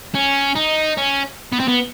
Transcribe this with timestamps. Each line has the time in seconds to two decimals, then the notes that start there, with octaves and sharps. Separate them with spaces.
0.15 C#4
0.55 D#4
0.97 C#4
1.52 B3
1.59 C4
1.68 B3